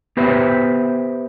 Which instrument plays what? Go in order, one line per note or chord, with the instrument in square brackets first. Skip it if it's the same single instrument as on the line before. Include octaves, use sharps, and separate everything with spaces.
[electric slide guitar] B3 G4 B4 C5 E5